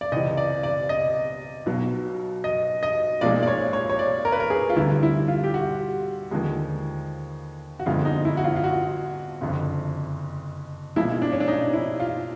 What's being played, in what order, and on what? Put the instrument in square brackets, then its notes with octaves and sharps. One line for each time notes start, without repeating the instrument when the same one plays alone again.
[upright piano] D5
C#2 C3 E3 D#5
D5
D5
D#5
B1 B2 F#3
D#5
D#5
B1 A#2 F3 G#3 D5
D5
C#5
C#5
C#5
D5
A#4
B4
A#4
G#4
F4
D2 D3 G3 E4
E4
F4
G4
F#4
D#2 D3 F3 G#3
F#4
G1 F2 D3 F3 G#3 F4
D#4
E4
F#4
F4
F4
F#4
F#1 F2 D3
B1 A#2 F3 G#3 E4
D4
C#4
D4
D#4
E4
F4